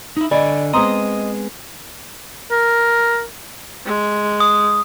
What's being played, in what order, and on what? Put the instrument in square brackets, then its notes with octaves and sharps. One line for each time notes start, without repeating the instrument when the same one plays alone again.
[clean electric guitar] D#4 E4
[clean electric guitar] D3 G#5 [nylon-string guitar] D5 [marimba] D#5 B5
[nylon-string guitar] G#3 B3 C4 [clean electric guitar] D#5 [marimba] A#5 C6 D#6
[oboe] A#4
[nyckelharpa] G#3
[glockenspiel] D#6